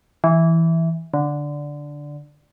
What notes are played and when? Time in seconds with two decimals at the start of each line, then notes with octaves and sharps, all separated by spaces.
0.24 E3
1.14 D3